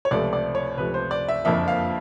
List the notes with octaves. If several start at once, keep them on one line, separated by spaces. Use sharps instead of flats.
C#5
C#2 C3 F3 A3 D5
D5
C#5
C#2 C3 F3 A3 B4
C5
D5
E5
F#1 F2 D3 F3 A#3 E5
F5